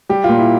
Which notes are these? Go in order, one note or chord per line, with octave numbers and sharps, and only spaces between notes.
G3 G4
A#2 F4
E4